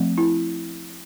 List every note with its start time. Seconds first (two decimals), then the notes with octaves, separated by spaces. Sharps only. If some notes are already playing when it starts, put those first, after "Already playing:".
Already playing: F3 A3 C4
0.18 E4